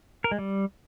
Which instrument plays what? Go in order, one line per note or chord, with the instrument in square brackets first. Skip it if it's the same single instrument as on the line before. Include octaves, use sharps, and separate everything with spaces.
[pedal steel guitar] A#4
G#3
G3